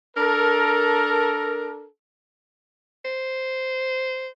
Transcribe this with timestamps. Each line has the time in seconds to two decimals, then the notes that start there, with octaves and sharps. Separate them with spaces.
0.17 D4 A4 A#4
3.05 C5